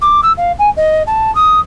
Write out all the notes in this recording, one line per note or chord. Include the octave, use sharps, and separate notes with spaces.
D6
E6
F5
G#5
D#5
A5
D#6